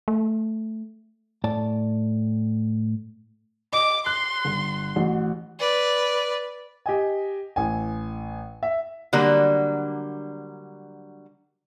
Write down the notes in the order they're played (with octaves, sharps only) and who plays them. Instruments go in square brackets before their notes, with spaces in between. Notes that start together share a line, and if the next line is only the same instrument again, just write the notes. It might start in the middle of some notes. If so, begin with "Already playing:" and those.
[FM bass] A3
[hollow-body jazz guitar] A2 D5 A5
[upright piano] D#5 [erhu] D6
[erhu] C6 [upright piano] F#6
[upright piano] G1
A1 F#4
[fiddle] B4 D5
[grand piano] G4 D#5 G#5
A1 G#5
E5
[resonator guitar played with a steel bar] D3 F#3 G3 A#3